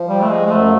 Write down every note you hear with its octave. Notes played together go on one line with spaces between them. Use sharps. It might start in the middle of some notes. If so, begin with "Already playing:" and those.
Already playing: F3
G3
A3
G#3
G#3
F#2 F#3 A3